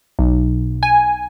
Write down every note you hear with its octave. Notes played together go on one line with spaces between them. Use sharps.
B1
G#5